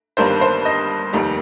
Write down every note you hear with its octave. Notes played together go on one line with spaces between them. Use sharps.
G1 G2 D#3 G3 A#3 C5
C5
D#5
F1 D#2 D#3 G3